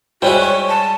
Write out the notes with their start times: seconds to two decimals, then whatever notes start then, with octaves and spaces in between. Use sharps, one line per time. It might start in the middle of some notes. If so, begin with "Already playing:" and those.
0.22 G3 G#3 E4 F#4 C5 C#5 G5
0.40 C#6
0.68 A5